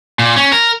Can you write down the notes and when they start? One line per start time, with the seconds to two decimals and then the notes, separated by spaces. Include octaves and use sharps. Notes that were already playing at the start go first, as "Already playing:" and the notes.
0.19 A#2
0.36 C#4
0.52 A#4